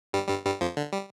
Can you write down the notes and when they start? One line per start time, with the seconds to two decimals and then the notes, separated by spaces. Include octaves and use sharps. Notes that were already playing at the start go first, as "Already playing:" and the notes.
0.13 G2 G3
0.29 G2 G3
0.45 G2 G3
0.61 F2 F3
0.77 D3
0.93 G3